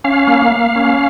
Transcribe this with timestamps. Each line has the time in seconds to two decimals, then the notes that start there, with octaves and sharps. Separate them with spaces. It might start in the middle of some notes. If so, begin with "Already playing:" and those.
0.04 C#4 F5
0.27 A#3
0.52 A#3
0.76 C#4